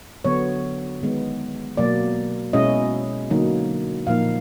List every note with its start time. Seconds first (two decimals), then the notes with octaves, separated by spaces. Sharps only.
0.25 D3 F#3 B3 C#5
1.02 D#3 G#3 B3
1.77 B2 F#3 A#3 D5
2.53 B2 G#3 C#4 E4 D#5
3.30 D3 F#3 A#3 D#4
4.07 A#2 F3 A#3 D#4 F5